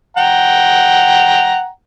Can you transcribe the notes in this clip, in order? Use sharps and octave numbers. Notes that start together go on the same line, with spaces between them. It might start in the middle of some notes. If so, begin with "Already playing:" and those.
F#5 G5 A#5